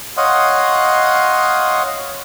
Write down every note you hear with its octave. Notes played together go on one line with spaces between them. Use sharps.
C#5 D#5 F5 F#5 C6 D#6